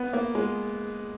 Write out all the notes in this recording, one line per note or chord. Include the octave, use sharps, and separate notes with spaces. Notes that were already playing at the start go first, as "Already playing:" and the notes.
Already playing: B3
A#3
G#3